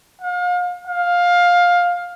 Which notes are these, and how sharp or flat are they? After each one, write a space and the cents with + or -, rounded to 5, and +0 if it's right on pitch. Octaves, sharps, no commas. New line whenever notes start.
F5 +40
F5 +15